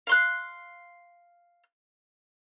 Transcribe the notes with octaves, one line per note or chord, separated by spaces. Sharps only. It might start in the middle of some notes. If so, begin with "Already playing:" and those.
F5 C6 F#6